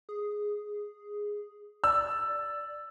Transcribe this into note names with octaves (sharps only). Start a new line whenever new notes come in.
G#4
D5 E6